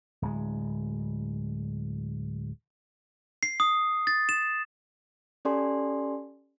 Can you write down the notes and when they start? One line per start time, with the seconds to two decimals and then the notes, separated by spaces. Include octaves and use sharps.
0.22 D1 G#3
3.43 C7
3.60 D#6
4.07 A6
4.29 E7
5.45 C#4 G4 A4 D5 G#5 C6